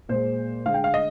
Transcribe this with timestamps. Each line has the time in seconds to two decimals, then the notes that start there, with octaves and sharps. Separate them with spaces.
0.09 A#2 G#3 C5
0.66 D3 G#3 F5
0.74 G5
0.84 F5
0.94 D#5